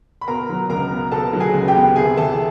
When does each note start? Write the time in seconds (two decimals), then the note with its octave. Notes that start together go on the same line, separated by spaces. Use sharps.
0.21 B5
0.28 B2 A#4 A#5
0.49 F#3
0.70 C#2 A#4 A#5
0.91 B3
1.12 B2 A4 A5
1.33 F#3
1.40 G#4 G#5
1.54 C#2
1.68 G4 G5
1.75 B3
1.96 C3 G#4 G#5
2.17 E3 A4 A5